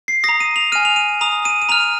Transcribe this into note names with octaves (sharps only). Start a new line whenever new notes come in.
C7
A#5 D#6 A#6
D#7
F7
G#5 F6 D#7
F7
D#7
A#5 D#6 F7
D#7
D#7
A#5 F6 F7